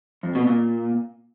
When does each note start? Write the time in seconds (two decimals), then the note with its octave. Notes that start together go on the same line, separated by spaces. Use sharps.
0.23 F2
0.35 B2
0.47 A#2